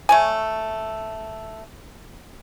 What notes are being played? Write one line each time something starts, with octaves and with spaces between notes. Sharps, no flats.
A3 C#5 G#5